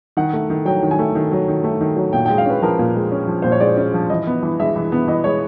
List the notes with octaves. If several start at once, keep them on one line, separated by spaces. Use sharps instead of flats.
D#3 F#5
A3
D#3
F#3 G5
D#3
G#5
A3
D#3
F#3
D#3
A3
D#3
F#3
A#2 G5
G#3 G5
F5
C#4 B4
F3 A#4
A#2
G#3
C#4
F3
A#2 C5
C#5
G#3 D5
C#4
F3
E3 D#5
B3
E3
G#3 E5
E3
B3
E3 D#5
G#3 C#5